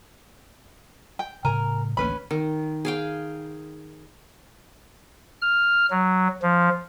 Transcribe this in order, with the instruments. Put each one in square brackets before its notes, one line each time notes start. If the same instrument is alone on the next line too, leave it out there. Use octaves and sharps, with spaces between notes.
[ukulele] G5
[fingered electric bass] A2 C#3 [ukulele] A#4 G#5 A#5
[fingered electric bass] A1 D2 A#3 [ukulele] C#4 B4 B5
[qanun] D#3
G#4 F5 G5
[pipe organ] F6
F#3
F3